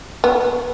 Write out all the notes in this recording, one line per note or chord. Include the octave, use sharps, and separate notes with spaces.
B3